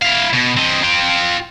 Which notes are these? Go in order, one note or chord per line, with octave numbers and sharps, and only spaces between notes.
E4 F5
B2
C4 D#5
F4 G5